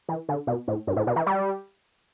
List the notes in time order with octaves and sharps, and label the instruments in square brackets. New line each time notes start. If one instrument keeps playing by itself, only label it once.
[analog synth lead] E3
D3
B2
A2
G2
A2
B2
E3
G3